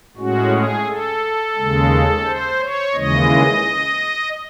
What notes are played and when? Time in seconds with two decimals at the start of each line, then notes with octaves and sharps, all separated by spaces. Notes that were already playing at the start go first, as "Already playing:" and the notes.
0.17 A2 G#3 C#4 F#4
0.52 G#4
0.86 A4
1.56 D#2 C#3 G#3
2.25 C5
2.60 C#5
2.94 D#2 C#3 E3 G#3 D#5